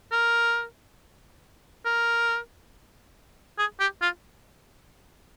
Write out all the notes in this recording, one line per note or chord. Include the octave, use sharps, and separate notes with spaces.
A#4
A#4
G#4
G4
F4